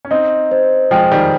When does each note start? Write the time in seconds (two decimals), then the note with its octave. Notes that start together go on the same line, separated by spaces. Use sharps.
0.05 C#4
0.11 C4 D#4 D#5
0.51 C5
0.91 F3 G#3 G5
1.12 D#3 G3